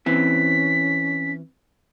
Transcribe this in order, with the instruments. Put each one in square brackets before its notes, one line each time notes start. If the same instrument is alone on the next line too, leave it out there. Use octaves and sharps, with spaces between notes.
[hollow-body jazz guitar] E3 C4 [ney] C#4 [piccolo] B6